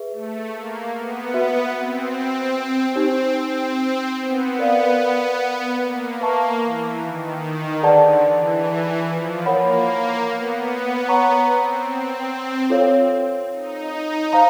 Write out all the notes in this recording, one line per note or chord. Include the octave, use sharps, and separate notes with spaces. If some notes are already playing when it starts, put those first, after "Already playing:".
Already playing: G#4 B4 E5
A3
A#3
B3
F#4 B4 E5
C4
C4 D#4 G4 C5
C4
B3
A#4 D5 F5
A#3
B4 E5 A5 C#6
E3
D#3
D3 G#4 B4 D5 F#5 A5
E3
F3
A#3 A#4 C#5 F#5 B5
B3
C#5 F#5 A#5 C#6
C4
C4
F4 A4 C#5 F5
D#4
C5 F5 A#5